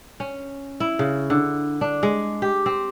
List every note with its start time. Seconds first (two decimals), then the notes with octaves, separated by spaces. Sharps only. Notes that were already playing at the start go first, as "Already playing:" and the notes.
0.20 C#4
0.80 E4
0.99 C#3
1.30 D3
1.81 D4
2.03 G#3
2.42 G4
2.66 C4